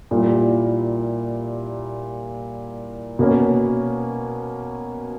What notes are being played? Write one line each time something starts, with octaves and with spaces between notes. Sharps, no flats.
A#2 G3 A#3 E4
B2 A#3 C#4